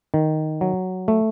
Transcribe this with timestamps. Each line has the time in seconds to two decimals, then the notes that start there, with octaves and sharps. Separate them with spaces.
0.14 D#3
0.61 F#3
1.08 A3